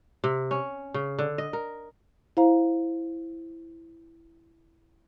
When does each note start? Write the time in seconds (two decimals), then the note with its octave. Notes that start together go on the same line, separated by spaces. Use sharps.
0.24 C3
0.51 C#4
0.94 C#3
1.19 D3
1.38 D#5
1.53 A#4
2.37 E4 C5 F5 A#5